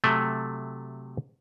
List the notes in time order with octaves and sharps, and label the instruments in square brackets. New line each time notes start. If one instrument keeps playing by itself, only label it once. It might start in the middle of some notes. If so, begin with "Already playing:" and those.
[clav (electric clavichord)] C3 F#3 A3 A4 G5 G#5